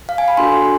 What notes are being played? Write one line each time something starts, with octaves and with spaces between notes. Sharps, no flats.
F5
G#5
B5
D4 F#4 A4 C6